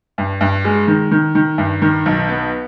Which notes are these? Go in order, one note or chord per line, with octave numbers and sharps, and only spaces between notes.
G2
G2
G#3
D#3
D#3
D#3
G2
D#3
B1
B3